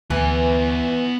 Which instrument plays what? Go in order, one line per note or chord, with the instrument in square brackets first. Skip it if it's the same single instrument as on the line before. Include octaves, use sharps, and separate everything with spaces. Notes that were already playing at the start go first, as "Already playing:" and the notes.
[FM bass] D2 [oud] E3 [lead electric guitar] B3 G#5